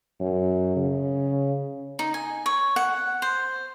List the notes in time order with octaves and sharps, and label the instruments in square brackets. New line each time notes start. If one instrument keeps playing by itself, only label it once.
[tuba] F#2
C#3
[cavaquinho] D#4
G#5
C#5
F#5
C5